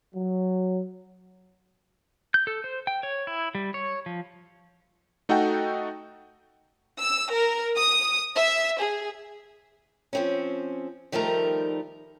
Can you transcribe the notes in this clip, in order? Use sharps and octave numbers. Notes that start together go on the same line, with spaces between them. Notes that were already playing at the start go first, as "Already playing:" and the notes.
F#3
G6
A4
C5
G5
C#5
E4
G3
C#5
F3
A3 D#4 F#4 A4 F#5 G5
E6
A#4
D#6
E5
G#4
F3 C4 C#4
D#3 F3 G3 A3 D#4 A#4